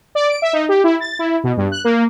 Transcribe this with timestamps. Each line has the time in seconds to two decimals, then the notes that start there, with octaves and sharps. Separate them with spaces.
0.15 D5
0.29 D7
0.42 E5
0.53 D#4
0.69 G4
0.84 E4
1.00 A6
1.19 E4
1.44 B2
1.57 G2
1.72 F#6
1.84 A#3